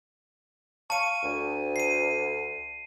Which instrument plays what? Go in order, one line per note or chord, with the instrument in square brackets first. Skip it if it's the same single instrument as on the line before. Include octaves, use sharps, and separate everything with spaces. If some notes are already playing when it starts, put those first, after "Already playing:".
[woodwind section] F5 C#6 [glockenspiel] A5 D#7
[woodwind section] D2
[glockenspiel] C7 D#7